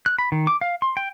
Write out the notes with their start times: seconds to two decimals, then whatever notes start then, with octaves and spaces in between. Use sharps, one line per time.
0.06 F#6
0.18 B5
0.32 D#3
0.47 D6
0.61 F5
0.82 C6
0.97 G5